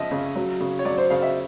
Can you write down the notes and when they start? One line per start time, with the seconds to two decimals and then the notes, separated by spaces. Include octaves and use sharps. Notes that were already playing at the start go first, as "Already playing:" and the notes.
Already playing: C#3 F3 D#5 E5
0.11 C#3
0.35 F#3
0.60 C#3
0.79 C#5
0.85 F#3 D5
0.98 C5
1.10 C#3 F5
1.22 E5